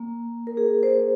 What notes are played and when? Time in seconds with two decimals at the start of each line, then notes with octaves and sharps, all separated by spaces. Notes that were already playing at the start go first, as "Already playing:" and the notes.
Already playing: A#3
0.47 A#4
0.57 G#4
0.83 C5